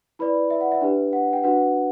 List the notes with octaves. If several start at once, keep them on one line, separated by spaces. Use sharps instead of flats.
E4 B4 D5 B5
E5
F#5
E5
D4 G4 B4
F#5
G5
D4 F#4 B4 F#5